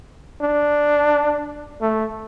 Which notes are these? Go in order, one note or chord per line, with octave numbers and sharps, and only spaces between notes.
D4
A3